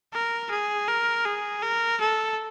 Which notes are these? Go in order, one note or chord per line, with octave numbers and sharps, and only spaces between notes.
A#4
G#4
A#4
G#4
A#4
A4